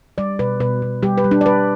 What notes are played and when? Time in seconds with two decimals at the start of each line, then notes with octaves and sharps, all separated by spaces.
0.18 G3 D5
0.39 B2 B4
0.60 B2 B4
0.82 B2
1.02 G3 G4
1.18 B4
1.24 G3
1.31 D4
1.41 D5
1.46 G3 B4